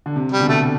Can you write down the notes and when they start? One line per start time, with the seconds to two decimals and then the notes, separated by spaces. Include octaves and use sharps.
0.06 D3
0.16 C3
0.32 G3
0.40 B2 D3
0.49 A3